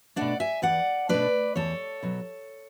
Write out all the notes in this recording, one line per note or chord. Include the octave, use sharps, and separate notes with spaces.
B2 A3 D4 D5 F#5
E5 G#5
E2 D5 F#5
B2 A3 D4 B4 D5
E2 A4 C#5
B2 F#3